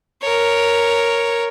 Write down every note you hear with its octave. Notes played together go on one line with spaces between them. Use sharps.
A#4 C#5